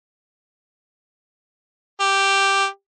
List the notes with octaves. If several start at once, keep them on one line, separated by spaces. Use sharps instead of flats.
G4